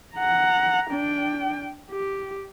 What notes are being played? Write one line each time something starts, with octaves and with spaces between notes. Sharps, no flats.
F#5 A#5
D4 G5
G4